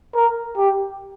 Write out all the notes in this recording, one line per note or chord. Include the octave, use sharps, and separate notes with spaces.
A#4
G4